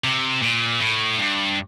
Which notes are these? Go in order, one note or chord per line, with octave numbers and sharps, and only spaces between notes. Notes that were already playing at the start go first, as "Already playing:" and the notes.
C3
A#2
A2
G2